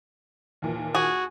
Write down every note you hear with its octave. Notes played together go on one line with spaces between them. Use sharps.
D#2 A#2 E3
F#4 G#4